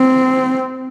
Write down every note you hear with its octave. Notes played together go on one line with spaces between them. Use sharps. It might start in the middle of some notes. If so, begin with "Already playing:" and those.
Already playing: C4